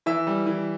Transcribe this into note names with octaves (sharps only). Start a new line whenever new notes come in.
E3 E5
G3
E3